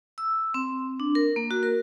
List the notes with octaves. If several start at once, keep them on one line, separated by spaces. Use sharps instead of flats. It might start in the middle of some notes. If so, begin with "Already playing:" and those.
E6
C4
D4
A#4
A#3
F#4
A#4